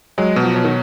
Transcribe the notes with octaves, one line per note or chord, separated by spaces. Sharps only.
F#3 G#3
B2
F3
B2
D#3